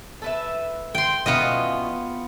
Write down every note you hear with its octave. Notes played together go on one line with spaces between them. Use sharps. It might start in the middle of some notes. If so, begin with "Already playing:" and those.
A4 B4 E5
G5 C6
B2 E3 B3 C#4 F4 D#5